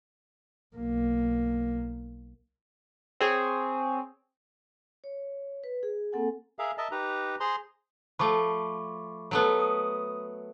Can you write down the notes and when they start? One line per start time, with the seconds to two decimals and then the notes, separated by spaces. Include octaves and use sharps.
0.76 B1 A#3
3.20 C4 G#4 C#5
5.04 C#5
5.64 B4
5.83 G#4
6.12 A#3 C4 A4 F#5 G#5
6.59 G#4 A#4 E5 F5
6.78 A#4 D#5 E5 A5
6.91 D#4 G4 B4 A#5
7.40 G#4 C5 A#5 C6
8.19 F3 A3 B5 C#6 D6
9.31 F#3 A3 B3
9.59 D#6